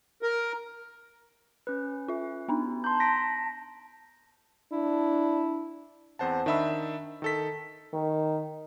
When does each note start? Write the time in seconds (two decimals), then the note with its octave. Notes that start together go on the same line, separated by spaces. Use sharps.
0.22 A#4
1.67 C#4 B4
2.08 F4 E5
2.48 B3 D4 D#4
2.84 A5 A#5 C6 G6
3.00 A#6 B6 D7
4.72 D4 E4
6.19 E2 C4 C5 F#5 A5
6.46 D#3 D4 E5 B5 E6
7.22 D#3 A4 B6
7.93 D#3